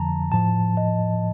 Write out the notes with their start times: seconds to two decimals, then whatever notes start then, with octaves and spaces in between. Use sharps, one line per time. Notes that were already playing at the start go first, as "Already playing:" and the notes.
Already playing: F2 D3 F3 A5 A#5
0.32 A2 F3 A5
0.77 D#5